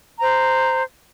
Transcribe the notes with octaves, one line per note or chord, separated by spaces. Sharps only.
C5 A#5